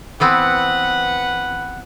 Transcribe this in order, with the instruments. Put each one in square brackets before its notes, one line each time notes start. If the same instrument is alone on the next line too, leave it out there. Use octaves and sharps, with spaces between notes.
[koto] E3 B3 C4 [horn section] B4 F#5